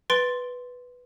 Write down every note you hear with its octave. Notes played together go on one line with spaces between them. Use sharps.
B4 C6 A6 D7 G7